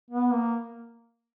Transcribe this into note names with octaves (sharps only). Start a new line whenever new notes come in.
B3
A#3